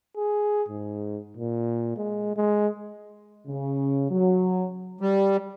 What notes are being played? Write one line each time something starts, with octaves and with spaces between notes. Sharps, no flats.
G#4
G#2
A#2
G#3
G#3
C#3
F#3
G3